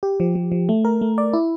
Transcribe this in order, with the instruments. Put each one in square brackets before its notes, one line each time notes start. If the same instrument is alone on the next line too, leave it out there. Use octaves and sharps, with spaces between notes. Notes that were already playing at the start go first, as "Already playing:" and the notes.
[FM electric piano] G4
F3
F3
F3
A3
A#4
A3
D5
E4